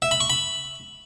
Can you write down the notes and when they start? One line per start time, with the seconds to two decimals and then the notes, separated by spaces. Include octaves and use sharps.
0.02 E5
0.11 B5
0.20 C#6
0.30 B5